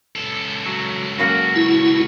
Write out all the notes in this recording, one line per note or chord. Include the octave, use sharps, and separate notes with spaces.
C#2 A4
F#3
C#3 F#3 A#3 F#4
E4